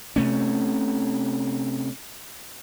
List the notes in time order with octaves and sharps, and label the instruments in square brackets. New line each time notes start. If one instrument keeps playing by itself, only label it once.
[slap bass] C3 A3 C#4